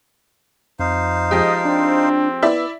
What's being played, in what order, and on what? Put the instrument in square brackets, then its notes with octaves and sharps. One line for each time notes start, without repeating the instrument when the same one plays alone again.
[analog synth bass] F2 [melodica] D#4 C5 F5
[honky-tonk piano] F3 G#3 G4 [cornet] D#5
[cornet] C4 [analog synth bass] D4
[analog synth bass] B3 [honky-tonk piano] E4 D5 E5